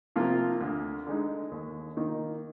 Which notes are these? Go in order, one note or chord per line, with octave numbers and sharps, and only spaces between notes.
C3 F3 A#3 F4
D2
D3 G#3 D#4
D#2
D#3 A#3 D#4